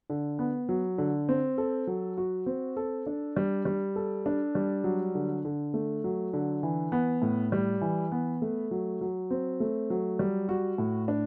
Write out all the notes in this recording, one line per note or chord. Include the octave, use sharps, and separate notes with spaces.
D3
B3
F#3
D3
C4
A4
F#3
F#4
C4
A4
D4
G3
G3
A4
D4
G3
F#3
D3
D3
A3
F#3
D3
E3
B3
A2
G3
E3
B3
A3
F#3
F#3
C4
A3
F#3
G3
F#4
A2
D4